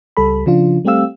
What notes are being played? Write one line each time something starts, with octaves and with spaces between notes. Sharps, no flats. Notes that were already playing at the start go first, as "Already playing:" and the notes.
C#2 G3 A4 B5
C#3 F3 D4 F4
G3 A3 C4 G4 F5 E6